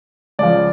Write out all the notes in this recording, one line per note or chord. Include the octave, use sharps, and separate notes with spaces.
C#2 C#3 F3 D5